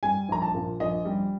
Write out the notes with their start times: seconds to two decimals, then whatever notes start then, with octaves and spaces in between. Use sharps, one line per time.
0.03 G3 G#5
0.29 A#1 A#5
0.42 A5
0.55 A#2
0.80 A#1 D#5
1.05 G3